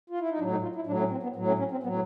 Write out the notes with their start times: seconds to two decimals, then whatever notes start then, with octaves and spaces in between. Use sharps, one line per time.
0.10 F4
0.20 E4
0.30 D#4
0.39 A2 F#3 D4
0.51 D#4
0.62 F4
0.75 E4
0.87 A2 F#3 D4
1.00 C#4
1.11 C4
1.23 B3
1.36 A2 F#3
1.48 C#4
1.59 C#4
1.71 C4
1.83 A2 F#3 B3